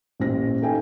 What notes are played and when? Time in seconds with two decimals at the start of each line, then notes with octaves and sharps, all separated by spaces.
0.20 A1 A#2 G4 C5 A#6
0.62 D#4 A4 G5 G#5